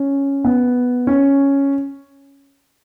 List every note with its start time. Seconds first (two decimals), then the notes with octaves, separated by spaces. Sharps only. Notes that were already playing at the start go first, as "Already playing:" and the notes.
Already playing: C#4
0.45 B3
1.07 C#4